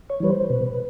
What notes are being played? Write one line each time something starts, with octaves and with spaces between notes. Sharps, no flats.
C#5
E3 G3 B4
C5
B2 B4